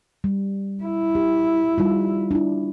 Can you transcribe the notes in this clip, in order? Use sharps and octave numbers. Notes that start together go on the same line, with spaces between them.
G3
E4
G4
G3 D#4 F4
D4 E4